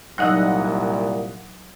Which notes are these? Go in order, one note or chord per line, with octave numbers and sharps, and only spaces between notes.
C2 A#2 F#3 D#4 D#5 F#5 E6 F#6